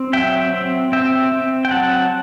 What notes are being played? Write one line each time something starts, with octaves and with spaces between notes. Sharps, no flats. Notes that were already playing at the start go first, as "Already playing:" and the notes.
Already playing: C4
F#3 E5 G5
C4
C4 E5 G5
C4
G5
F#3 F#5 A5